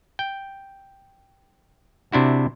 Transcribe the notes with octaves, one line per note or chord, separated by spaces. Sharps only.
G5
C3 D4 E4 F#4